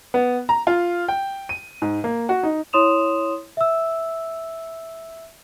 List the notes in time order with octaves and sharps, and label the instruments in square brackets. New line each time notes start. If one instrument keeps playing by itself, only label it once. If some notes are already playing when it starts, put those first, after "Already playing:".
[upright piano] B3
A#5
F4
G5
D#7
G#2
A#3
F#4
D#4
[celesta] E4 C#5 C6 D#6 E7 F7
E5 E6